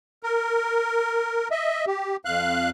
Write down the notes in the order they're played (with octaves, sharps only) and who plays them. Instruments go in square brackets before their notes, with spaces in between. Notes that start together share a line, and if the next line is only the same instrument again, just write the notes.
[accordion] A#4
D#5 E5
G4
F2 F5 F#6